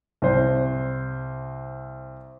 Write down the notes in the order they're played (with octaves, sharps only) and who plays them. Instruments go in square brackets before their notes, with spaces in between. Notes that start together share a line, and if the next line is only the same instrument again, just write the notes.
[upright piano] C2 C5